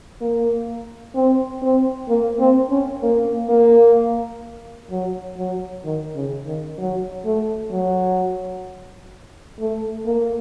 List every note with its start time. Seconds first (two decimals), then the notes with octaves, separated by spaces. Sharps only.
0.21 A#3
1.15 C4
1.62 C4
2.09 A#3
2.39 C4
2.70 C#4
3.03 A#3
3.49 A#3
4.90 F#3
5.37 F#3
5.84 D#3
6.15 C#3
6.46 D#3
6.78 F#3
7.25 A3
7.71 F#3
9.60 A3
10.06 A#3